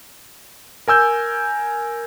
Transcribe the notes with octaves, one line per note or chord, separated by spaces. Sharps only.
A#4 G#5 E6 G6